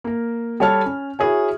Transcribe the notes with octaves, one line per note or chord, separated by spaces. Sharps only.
A#3 A#4
G3 A4 C#5 A5 F6
C#4
E4 F#4 G#4 C#5 G#5